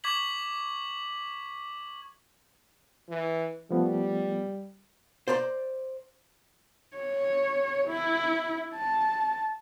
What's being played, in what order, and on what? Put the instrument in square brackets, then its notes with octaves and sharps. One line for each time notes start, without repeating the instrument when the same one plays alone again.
[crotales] C#6 D6 G#6 B6 F#7
[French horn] E3
[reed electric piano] F3 A3 B3 [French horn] G3
[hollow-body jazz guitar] C5 D5 A#5 C6
[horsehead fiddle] C#5
E4
A5